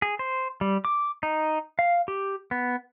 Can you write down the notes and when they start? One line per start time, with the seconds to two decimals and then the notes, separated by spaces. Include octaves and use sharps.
0.02 G#4
0.19 C5
0.61 G3
0.85 D6
1.23 D#4
1.79 F5
2.08 G4
2.51 B3